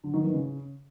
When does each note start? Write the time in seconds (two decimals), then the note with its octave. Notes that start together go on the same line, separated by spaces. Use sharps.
0.04 D3
0.13 D#3
0.23 E3
0.33 C#3